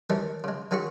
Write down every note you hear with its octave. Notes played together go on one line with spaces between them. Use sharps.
D#3 E3 G3 A3 C#4 D#4
C#3 G#3
D#3 C#4 F4 F#4 G#4 C#6